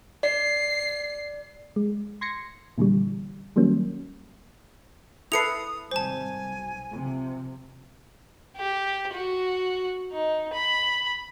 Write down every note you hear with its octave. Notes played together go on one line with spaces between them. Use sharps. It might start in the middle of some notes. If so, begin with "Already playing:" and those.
D5 C7
G#3
C6 G#6 A#6 C7 C#7
A#2 D3 E3 G3
D#3 F#3 G3 A#3 C#4
E4 A4 B4 D#6 C7 C#7 F7
G#1 C3 G3 C5 G#5 A5
B1
C3 F3
G4
F#4
D#4
B5